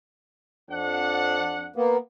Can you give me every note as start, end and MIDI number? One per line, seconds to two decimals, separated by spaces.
0.70 1.71 41
0.70 1.71 62
0.70 1.71 78
1.76 1.97 58
1.76 1.97 59